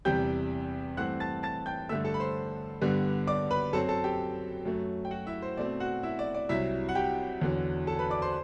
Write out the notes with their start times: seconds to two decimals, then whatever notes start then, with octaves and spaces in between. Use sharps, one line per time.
0.05 E2 C3 G3 G5 G6
0.97 G2 E3 A3 C4 F#5 F#6
1.20 A5 A6
1.43 A5 A6
1.66 G5 G6
1.89 G2 D3 A3 E5 E6
2.05 A4 A5
2.14 B5
2.20 C5 C6
2.81 G2 D3 G3 B3
3.27 D5 D6
3.51 B4 B5
3.73 F#2 F#3 C4 A4 A5
3.89 A4 A5
4.04 G4 G5
4.65 F#2 F#3 A3
5.05 G5
5.11 F#4 F#5
5.27 E4 E5
5.42 C5
5.57 B2 A3 C4 D5
5.80 F#4 F#5
6.03 E4 E5
6.19 D5
6.34 D5
6.49 C2 C3 F#3 E4 E5
6.89 F#5
6.95 G4 G5
7.41 E2 D3 F#3
7.87 A4 A5
7.99 B4 B5
8.10 D5 D6
8.22 C5 C6